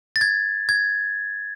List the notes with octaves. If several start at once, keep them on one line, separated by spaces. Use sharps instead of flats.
A6
G#6
G#6